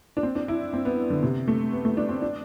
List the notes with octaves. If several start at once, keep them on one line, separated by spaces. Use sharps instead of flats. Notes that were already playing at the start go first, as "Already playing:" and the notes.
D4
C4
D4
E4
C4
B3
D3
C3
A3
B3
A3
D4
C4
D4